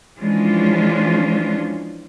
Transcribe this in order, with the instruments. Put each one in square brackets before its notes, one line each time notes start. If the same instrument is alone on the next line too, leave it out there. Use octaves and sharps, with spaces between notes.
[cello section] E3 F3 G#3 C#4 D4 F4